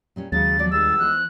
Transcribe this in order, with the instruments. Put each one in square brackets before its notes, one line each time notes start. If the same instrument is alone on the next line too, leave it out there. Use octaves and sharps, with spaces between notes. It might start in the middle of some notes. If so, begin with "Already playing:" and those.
[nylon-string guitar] A#2 G3 C#4
[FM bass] D#2 [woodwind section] C#3 [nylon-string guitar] F#3 G#3 C#4 [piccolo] A6
[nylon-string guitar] F3 F#3 B3 [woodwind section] D5
[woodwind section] C#2 G#4 E6 [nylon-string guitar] G3 D4 [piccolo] A6
[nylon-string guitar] E3 B3 C5 [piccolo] F#6